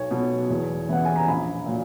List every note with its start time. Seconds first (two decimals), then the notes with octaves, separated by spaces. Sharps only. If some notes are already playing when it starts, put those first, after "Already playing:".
Already playing: B1 C#5
0.11 B2 F#3 B3
0.50 E2
0.88 C#3 E3 B3 F#5
1.05 G#5
1.16 A#5
1.28 A#1 B5
1.66 A#2 F#3